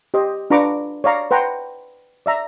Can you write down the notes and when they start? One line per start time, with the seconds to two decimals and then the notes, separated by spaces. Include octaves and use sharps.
0.14 G4 C5 D#5
0.50 D4 F4 B4 A#5 C#6 D6
1.04 C#5 D5 F5 A#5
1.31 B4 C5 F#5 G5 A#5
2.26 D5 E5 A#5